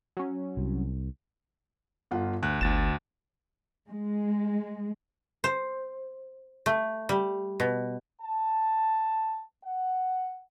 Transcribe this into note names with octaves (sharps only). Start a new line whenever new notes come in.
F#3 C#4
C2
G1 F4 F#5
D2 F#6
G1 D2 A6 E7
G#3
C5
A3
G3
B2
A5
F#5